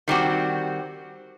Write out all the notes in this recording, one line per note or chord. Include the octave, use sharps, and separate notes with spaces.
D#3 G3 C4 F#4